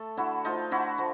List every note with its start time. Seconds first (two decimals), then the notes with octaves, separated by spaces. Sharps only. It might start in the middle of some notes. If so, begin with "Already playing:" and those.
Already playing: A3 A4
0.17 D3 E4 F#4
0.45 F3 A3 D#4 F4
0.71 D3 E4 F#4
0.98 F3 A3